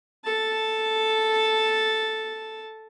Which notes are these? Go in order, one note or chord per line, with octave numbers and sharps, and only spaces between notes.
A4 A5